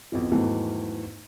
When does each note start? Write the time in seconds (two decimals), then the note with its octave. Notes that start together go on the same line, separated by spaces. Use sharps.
0.12 B1 F2 E3
0.32 E2 G#2 D#3 E3 F#3 A3